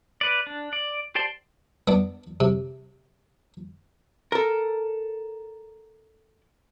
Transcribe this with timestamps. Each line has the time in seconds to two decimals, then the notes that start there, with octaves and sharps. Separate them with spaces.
0.21 B4 D5
0.47 D4
0.73 D5
1.15 G4 C5 D5 A5 C6
1.88 B3 D4
2.40 C3
4.32 A4 A#4